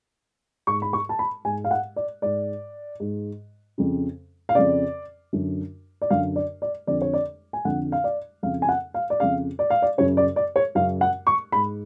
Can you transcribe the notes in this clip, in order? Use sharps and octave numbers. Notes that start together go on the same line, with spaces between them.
G#2 C#6
B5
C#6
A5
B5
G#2 G#5
F5
F#5
D5
G#2 D5
G#2
F2 C#3
F5
F2 C#3 D5
F#2 D3
D5
F#2 D3 F5
D5
D5
F2 D3 D5
C#5
D5
G#5
F2 D3 F#5
F5
D5
F2 C#3 F5
G#5
F#5
F5
D5
F2 C#3 F5
D5
F5
D5
F#2 C#3 C#5
D5
D5
C#5
F#2 C#3 F5
F#5
C#6
G#2 B5